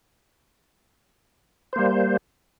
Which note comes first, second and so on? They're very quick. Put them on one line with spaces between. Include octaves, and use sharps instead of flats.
C5 A#3 G3